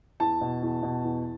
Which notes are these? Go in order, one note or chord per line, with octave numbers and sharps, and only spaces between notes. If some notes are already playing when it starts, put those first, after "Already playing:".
E2 A5
B2
E2
B2
E2